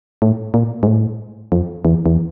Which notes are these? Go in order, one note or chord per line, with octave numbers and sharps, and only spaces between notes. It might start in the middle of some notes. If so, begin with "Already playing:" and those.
A2
A#2
G#2
A2
F2
E2
E2